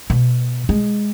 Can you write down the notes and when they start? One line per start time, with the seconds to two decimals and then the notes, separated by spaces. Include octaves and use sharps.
0.10 B2
0.69 G#3